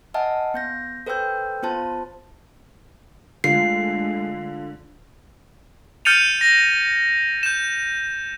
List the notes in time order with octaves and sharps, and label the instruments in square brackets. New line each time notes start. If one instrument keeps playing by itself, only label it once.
[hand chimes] D#5 E5 F#5 G#5 A5 F6
B3 G6 A#6
A4 B4 C5 G5 E6 G6
B3 F4 C5 A5
[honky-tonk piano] D3 [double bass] G#3 A3 [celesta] F4 F5 [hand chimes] C7
[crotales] F6 G6 A6 C#7 D#7 F7
A#6
G6 E7